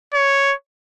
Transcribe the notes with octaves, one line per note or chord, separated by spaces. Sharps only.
C#5